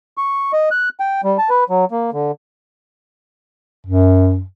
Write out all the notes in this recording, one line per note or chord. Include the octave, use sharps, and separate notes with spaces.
C#6
D#5
F#6
G5
G3
A5
B4
F#3
A#3
D3
F#2